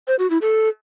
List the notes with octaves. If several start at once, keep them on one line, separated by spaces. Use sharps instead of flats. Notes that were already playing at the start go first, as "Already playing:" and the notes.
C5
F#4
E4
A4